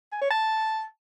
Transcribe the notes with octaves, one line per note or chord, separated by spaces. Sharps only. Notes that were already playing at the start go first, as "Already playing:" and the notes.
G#5
C#5
A5